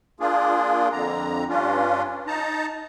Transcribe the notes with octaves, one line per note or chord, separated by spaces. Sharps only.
A#3 D4 F4 G#4
F2 D3 A#5
G2 C#4 D4 F4
D#4 A5 A#5